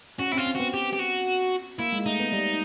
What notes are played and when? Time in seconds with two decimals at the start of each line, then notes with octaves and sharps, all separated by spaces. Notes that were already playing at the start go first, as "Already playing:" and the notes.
0.19 C#4 F#4
0.32 C4 E4
0.37 F4
0.46 C4
0.55 B3 F#4
0.74 G4
0.93 G4
0.99 F#4
1.79 A#3 E4
1.92 G#3
2.06 A3 D#4
2.20 B3
2.32 G3